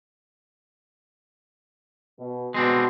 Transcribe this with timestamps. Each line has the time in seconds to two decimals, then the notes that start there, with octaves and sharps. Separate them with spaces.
2.17 B2
2.54 B2 G#3 C4 D4